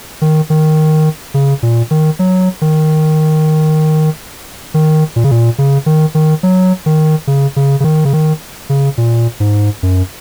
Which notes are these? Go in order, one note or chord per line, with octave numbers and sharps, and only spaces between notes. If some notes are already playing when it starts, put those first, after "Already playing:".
D#3
D#3
C#3
A#2
D#3
F#3
D#3
D#3
A#2
C#3
A#2
C#3
D#3
D#3
F#3
D#3
C#3
C#3
C#3
D#3
C#3
D#3
C#3
A#2
G#2
F#2